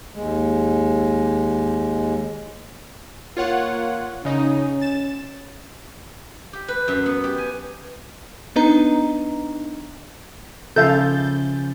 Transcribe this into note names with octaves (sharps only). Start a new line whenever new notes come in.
D#2 G#3
A#3 F4 C#5 F#5
C#3 C#4 D#4
A6 E7
G4
B4
F#2
B3
G4
G#5
B3 D4 D#4 B4 D#5 A#5
C#3 F3 A4 E5 F5 G6 A6